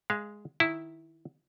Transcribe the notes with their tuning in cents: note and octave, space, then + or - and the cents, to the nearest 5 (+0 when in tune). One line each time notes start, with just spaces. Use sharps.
G#3 +0 F5 -25
D#3 +0 E4 -5